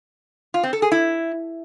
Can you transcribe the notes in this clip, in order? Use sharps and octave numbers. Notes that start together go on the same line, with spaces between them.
F4
C4
A4
G#4
E4